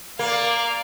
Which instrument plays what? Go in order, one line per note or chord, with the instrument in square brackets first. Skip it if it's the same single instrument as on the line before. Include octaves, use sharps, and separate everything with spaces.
[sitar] A#3 [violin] D5 F5